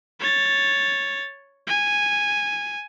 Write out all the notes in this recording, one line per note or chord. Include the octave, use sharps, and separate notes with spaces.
C#5 A6
G#5